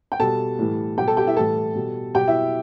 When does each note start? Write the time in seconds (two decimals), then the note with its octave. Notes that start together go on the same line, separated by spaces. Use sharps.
0.12 G5
0.19 B2 G3 A4 A5
0.59 A2 E3 G3
0.98 B2 G3 G4 G5
1.07 A4 A5
1.17 G4 G5
1.27 E4 E5
1.36 A2 E3 G3 A4 A5
1.75 B2 G3
2.15 B2 G3 G4 G5
2.28 E4 E5